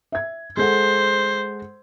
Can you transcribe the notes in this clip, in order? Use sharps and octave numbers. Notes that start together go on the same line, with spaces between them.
E5 G#6
G#3 A4 C5 F#5